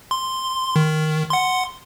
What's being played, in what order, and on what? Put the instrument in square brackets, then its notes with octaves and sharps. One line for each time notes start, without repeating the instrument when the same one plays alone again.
[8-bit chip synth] C6
D#3
F#5 C6